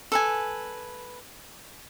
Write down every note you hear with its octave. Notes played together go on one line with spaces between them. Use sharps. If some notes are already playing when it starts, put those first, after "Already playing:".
A4 B4 G#5